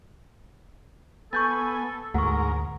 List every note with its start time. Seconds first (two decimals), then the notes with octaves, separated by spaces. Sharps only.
1.33 B3 A4 G#5 C#6 G6 A6
2.14 D2 G#2 A#4 F#5 C#6